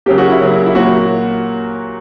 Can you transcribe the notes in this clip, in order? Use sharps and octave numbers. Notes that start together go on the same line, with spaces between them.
C#3 F#3 A#3 G4
F#4
E4
C#3 F#3 A#3
E4
A#2 F#3 A#3 F#4